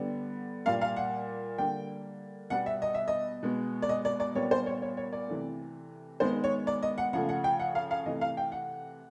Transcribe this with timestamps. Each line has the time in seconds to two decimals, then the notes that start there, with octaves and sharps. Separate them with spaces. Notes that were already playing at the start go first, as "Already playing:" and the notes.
Already playing: D3 G3 B3
0.66 A#2 G3 A#3 F5
0.81 F5
0.96 F#5
1.58 D3 G3 A#3 G5
2.50 B2 G3 B3 F#5
2.66 E5
2.82 D#5
2.95 E5
3.08 D#5
3.43 B2 G#3 B3
3.82 D5
3.89 D#5
4.05 D5
4.20 D5
4.35 A#2 G3 B3 C#5
4.51 C5
4.66 C#5
4.82 C#5
4.97 C#5
5.13 D5
5.28 C3 E3 A3
6.20 D#3 G#3 B3 C5
6.44 C#5
6.67 D5
6.83 D#5
6.98 F#5
7.13 C#3 F3 A3 F#5
7.29 F#5
7.44 G5
7.60 F#5
7.75 F5
7.91 F5
8.06 C3 E3 A3 D#5
8.21 F5
8.37 G5
8.52 F#5